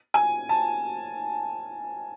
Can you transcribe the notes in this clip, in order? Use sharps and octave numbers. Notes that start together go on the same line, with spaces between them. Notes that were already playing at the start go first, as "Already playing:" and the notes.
G#5
A5